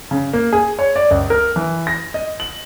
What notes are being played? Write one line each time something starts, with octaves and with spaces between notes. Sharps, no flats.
C#3
A#3
G#4
C#5
D5
C#2
A#4
E3
A#6
D#5
F#7